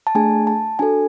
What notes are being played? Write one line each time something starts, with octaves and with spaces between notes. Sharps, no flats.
A5
A3 D4 G#4 G#5
A5
D4 F#4 A4 G#5